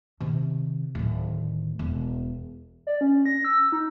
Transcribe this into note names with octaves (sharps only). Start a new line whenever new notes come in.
C3 D#3
D1 D#3
E1
D5
C#4
A#6
E6
D#4